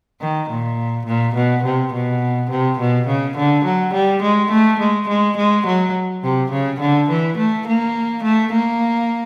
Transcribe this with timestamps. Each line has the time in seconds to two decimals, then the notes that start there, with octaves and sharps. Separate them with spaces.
0.21 D#3
0.50 A#2
1.07 A#2
1.35 B2
1.64 C3
1.93 B2
2.50 C3
2.79 B2
3.07 C#3
3.37 D3
3.65 F#3
3.94 G3
4.22 G#3
4.51 A3
4.79 G#3
5.09 G#3
5.37 G#3
5.67 F#3
6.23 C3
6.52 C#3
6.80 D3
7.10 E3
7.37 A3
7.67 A#3
8.23 A3
8.52 A#3